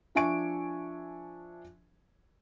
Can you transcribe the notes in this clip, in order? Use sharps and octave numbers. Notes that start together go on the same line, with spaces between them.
F3 D4 E5 G#5 C#6 D7